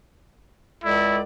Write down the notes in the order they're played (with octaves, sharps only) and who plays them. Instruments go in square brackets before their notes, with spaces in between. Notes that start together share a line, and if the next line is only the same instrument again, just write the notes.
[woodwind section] C#2 A4 D5 [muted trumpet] E4